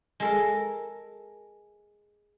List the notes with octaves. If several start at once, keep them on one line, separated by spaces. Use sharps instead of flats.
G#3 A4 A#4